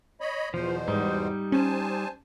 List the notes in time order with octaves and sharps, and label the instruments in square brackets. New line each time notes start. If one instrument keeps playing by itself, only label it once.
[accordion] C#5 D#5 B5
[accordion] E2 B2 C5 [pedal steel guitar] F3
[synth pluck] G#2 [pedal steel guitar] G3 D#4
[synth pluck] C#4 [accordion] C5 G#5 A5